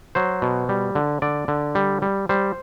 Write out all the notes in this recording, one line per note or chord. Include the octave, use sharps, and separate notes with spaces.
F#3 C5
B2
G3
D3
D3 D5
D3
G3
G3
G3 C5